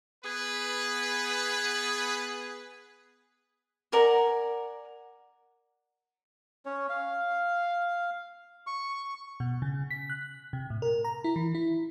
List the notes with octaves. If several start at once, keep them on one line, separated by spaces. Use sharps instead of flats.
B3 G#4 B4
A#4 D5 F#5 G#5
C#4 C#5
F5
C#6
B2
C#3
B6
F#6
C3
A2
A#4
A#5
E4
E3
E4